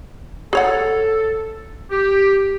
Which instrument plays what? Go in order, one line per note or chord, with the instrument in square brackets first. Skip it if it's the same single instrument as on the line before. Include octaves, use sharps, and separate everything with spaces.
[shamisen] G#4 C#5 F#5 [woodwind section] A4
[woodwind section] G4